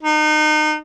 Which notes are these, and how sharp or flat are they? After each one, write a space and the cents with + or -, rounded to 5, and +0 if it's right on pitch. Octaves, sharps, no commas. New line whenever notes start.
D#4 -30